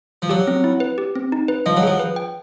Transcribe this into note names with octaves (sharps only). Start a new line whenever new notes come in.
F3
F#3 G4
C4
E4
B4
G4
C4
D#4
B4
F3 D#5
F#3
F3 G#4
B4
G5